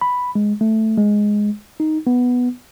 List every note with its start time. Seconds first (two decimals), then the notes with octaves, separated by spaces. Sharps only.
0.01 B5
0.35 G#3
0.61 A3
0.98 G#3
1.80 D#4
2.07 B3